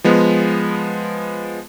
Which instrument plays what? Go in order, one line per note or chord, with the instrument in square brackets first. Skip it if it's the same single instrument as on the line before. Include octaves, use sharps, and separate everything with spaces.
[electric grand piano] F3 G#3 B3